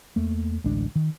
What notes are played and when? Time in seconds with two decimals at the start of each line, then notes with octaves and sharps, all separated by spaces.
0.16 E2 A3 A#3
0.64 A1 D2 G#3 D4
0.96 D#3